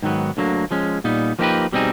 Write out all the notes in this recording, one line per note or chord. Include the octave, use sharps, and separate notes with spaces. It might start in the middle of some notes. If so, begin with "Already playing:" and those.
G#2 D#3 F#3 B3
D2 D3 F#3 A#3
F3 G#3 C#4
A#2 G3 B3 D#4
F3 A#3 D#4 G4 B4
B2 G3 C4 D#4 G#4